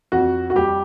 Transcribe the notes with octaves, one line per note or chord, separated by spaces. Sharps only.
F2 F#4
F#4
G3 G4